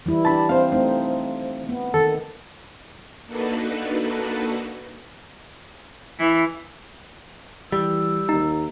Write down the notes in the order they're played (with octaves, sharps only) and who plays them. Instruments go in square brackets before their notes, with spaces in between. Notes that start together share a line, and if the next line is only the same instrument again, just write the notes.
[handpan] E3 G3 E4
[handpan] D4 G4 [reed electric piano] A5 B5
[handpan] C4 [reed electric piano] C5 F5
[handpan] A3 C4 D#4
B3
[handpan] D#3 [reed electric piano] A4
[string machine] A#3 D4 D#4 F#4 A4 B4
[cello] E3
[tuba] E3 [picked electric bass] G3 [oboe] E6
[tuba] D#2 [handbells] D#4